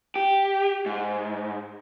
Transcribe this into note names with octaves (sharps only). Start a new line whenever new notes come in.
G4
G#2